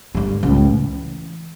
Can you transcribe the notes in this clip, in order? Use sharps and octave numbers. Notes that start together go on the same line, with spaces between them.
G2 D3
C#2 A2
E3